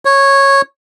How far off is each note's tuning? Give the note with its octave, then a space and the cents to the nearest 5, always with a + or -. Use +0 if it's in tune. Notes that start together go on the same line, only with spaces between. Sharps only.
C#5 -10